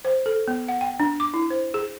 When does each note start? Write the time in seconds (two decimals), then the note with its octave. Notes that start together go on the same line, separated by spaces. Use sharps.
0.05 C5
0.26 A4
0.48 B3
0.68 F#5
0.81 G5
1.00 D4
1.20 D6
1.34 E4
1.50 C5
1.74 G#4